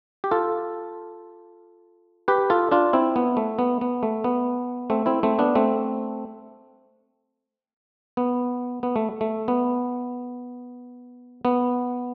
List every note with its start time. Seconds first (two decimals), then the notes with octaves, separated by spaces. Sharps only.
0.24 G4
0.31 F4 A4
2.28 G4 B4
2.50 F4 A4
2.71 D4 F4
2.93 C4 E4
3.16 B3
3.37 A3
3.59 B3
3.81 B3
4.03 A3
4.24 B3
4.90 A3 C4
5.06 C4 E4
5.23 A3 C4
5.39 B3 D4
5.55 A3 C4
8.17 B3
8.83 B3
8.96 A3
9.21 A3
9.48 B3
11.45 B3